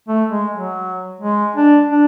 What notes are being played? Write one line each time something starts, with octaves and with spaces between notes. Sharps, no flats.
A3
G#3
F#3
G#3
D4
D4